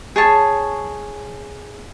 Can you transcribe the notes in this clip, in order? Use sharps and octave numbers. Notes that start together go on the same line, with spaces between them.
G#4 C#5 A5